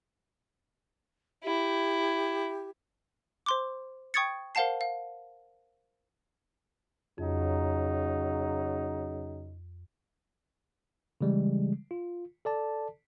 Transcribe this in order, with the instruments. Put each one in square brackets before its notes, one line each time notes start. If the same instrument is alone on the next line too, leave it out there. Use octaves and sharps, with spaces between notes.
[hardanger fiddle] E4 [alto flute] G4
[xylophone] C5 C6 D6
G5 C#6 D#6 G#6 A6 C#7
A#4 C5 F5 F#5 A5 C7
F5
[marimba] F2 [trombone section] C#3 F#3 D#4
[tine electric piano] C#3 E3 G3 G#3
F4
A4 D5 A5